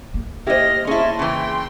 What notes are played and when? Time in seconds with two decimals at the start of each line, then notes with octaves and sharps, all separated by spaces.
0.14 A#3
0.47 E4 G4 C5 D#5 F6 A#6
0.87 C#4 E4 G#4 A5 C6
1.19 C#3 E3 G5 C6